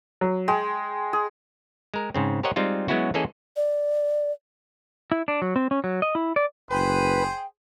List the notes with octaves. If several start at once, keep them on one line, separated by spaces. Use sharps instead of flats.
F#3
G#3 G5
G#4
G#3 A#4
G#2 C#3 C4
G4 A#4 C5 C#5 D#5 F#5
G3 G#3 C4 D#4 F4
F#3 G#3 B3 C#4 E4 F#4
E3 A#3 C#4 G#4 A4 D#5
D5
E4
D4
F#3
C4
C#4
F#3
D#5
E4
D5
F#1 G#4 B4 C5 G5